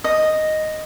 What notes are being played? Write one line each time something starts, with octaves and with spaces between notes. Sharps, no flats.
D#5